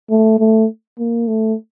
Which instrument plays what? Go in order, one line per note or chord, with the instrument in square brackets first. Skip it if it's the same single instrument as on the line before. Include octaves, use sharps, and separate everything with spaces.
[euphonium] A3
A3
A#3
A3